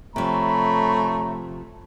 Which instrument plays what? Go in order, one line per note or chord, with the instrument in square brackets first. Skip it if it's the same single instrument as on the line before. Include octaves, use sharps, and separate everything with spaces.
[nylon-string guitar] C3 F3 [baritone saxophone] A3 [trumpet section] C#5 A#5 [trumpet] B5